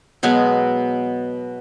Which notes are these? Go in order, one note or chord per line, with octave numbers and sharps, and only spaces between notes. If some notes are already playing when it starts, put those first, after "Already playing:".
B2 F#3 G#3 B3